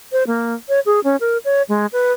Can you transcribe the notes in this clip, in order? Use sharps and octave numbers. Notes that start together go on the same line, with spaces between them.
C5
A#3
C#5
G#4
C#4
A#4
C#5
G#3
B4